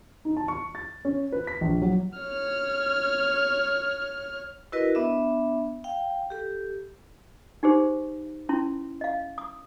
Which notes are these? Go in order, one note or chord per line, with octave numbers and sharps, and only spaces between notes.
D#4
A5
C#6
A6
C#4
B4
B6
A#1
F#3
C#5 F6
E4 F#4 A#4 B4 D#5
B3 D4 E5
F5 G5
G4 A4
D#4 G4 G#4 C5
C#4 E4 C6
D#5 F5
D#6